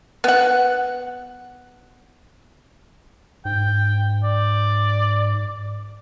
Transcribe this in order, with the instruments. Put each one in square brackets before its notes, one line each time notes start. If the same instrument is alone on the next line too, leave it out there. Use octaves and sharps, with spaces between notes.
[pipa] B3 F#5
[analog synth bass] G#2 [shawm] G5
[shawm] D5